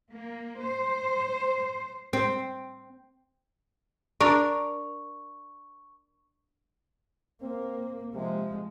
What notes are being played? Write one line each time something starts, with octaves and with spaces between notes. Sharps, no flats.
A#3
C5
C4
D4 A#4 C#6
A#3 C4
C3 F3 G#3